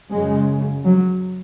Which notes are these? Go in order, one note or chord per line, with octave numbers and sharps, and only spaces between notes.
F#2 C#3 G#3
F#3